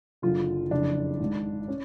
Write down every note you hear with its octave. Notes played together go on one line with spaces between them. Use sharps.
F#1 F#2 D3 F4
F#1 F2 C#3 D4
G#1 G#2
C#4